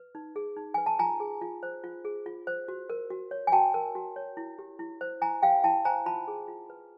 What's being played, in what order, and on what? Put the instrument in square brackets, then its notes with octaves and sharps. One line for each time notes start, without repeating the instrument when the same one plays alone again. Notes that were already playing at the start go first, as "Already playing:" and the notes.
Already playing: [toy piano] B4
D#4
G#4
D#4
B4 G#5
A5
F4 G#5 A#5
G#4
F4
C5
F4
G#4
F4
C5
F#4
A#4
F#4
C#5
G#5
F#4 G5 A5
A#4
F#4
C#5
E4
G4
E4
C5
E4 G#5 A#5
G4 F5 G5
E4 G5 A5
C5 G#5 A#5
F4 A5 B5
G#4
F4
B4